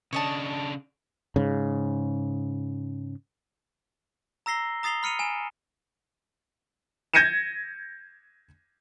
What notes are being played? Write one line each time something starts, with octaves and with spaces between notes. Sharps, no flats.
C#3 D4 C#5 D#5 A5
G#2 C#3
A#5 E6 A#6 C7 G7
A#5 D#6 A6 C7 F7 G7
B5 F6 C#7 D#7 F7
G#5 E7
G6 G#6 A#6 C#7 D#7 E7